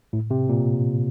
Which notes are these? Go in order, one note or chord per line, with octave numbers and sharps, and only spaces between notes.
A2
C3
A#2